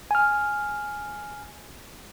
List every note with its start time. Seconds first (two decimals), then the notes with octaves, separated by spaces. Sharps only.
0.11 G#5 F6